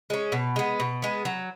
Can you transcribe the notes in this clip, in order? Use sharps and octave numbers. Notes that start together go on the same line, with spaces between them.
G#3 C#4
B2
G#3 B3
B2
G#3 B3
F#3